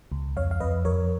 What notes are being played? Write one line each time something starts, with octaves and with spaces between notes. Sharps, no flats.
C#2
F2 C#5 F5
F5
F2 B4 D#5
F2 A#4 C#5